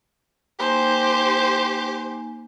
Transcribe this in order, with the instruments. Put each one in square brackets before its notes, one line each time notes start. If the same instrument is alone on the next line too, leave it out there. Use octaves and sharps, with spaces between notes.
[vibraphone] A#3 D#4 G#5 [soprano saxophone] G4 [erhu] C5